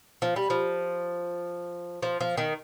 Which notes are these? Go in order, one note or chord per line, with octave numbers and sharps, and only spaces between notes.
F3
G3
F3
F3
F3
D#3